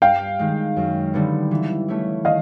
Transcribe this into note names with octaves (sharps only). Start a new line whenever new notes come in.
G2 F5 G5
D#3 G#3
F#2
D3 G3 B3 D#4
E3
A3 C#4 E4
D#3 D#5 F5